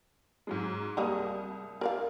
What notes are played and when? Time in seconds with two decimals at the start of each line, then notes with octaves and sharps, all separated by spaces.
0.47 G#2 F#3 G#3
0.97 C2 G3 G#3 A#3 D#6
1.81 A#4 D5 F5